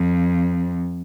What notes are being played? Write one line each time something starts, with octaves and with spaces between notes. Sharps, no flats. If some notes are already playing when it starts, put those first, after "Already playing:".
Already playing: F2